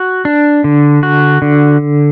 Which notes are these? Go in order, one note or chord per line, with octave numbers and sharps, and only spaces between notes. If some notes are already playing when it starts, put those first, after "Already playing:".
Already playing: F#4
D4
D3
F#4
D3